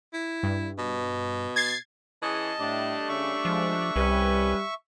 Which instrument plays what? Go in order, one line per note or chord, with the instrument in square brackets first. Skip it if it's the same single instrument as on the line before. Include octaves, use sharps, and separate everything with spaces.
[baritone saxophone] E4
[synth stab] G2
[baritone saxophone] B2
[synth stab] G#6 A6 C7
[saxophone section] E3 C#4 G#4 [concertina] D#5 A5
[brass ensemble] A2 [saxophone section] G3 A3 D4
[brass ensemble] C#3 C#4 [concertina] E5 C#6
[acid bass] F3 [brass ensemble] G#3
[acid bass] C2 [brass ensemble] G3 [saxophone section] C#4 B4